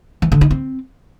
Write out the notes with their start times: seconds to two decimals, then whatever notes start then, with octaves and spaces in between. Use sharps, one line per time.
0.22 E3
0.32 D3
0.41 D#4
0.51 C4